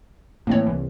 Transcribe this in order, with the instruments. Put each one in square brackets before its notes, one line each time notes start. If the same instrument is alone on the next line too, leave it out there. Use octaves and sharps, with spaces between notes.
[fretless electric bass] A2 E3 [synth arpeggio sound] A#3 C4 C#5
[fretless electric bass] C2 [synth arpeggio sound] E3